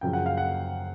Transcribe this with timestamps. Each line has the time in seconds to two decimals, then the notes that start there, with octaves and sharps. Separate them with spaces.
0.01 F#2 C#3 F3 G5
0.13 F#5
0.26 F5
0.37 F#5